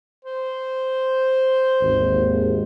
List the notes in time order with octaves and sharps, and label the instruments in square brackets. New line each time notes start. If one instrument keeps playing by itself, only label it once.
[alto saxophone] C5
[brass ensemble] G#1 D#2